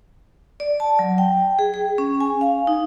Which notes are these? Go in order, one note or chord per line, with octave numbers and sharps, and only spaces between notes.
D5
A5
F#3
G5
G#4
G#4
C#4
G#5
F5
D#4